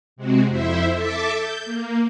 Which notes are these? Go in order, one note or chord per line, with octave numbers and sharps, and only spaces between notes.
C3 G#3 C4 F#4
F2 E4 C5 E5
A4 E5 A5 D6
G6
A#3